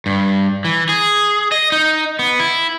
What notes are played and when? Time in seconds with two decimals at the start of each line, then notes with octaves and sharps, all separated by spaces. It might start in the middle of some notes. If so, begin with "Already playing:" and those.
0.06 G2
0.65 E3
0.89 G#4
1.52 D#5
1.72 D#4
2.19 B3
2.40 E4